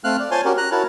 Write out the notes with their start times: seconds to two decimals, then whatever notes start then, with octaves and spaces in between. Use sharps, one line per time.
0.04 A3 C4 F5 F6 F#6
0.20 D5
0.31 F4 C5 C#5 G#5 A5 C6
0.45 C#4 F#4 G4 A#4
0.58 A#5 F#6
0.72 E4 F#4 A#4 C#5 A5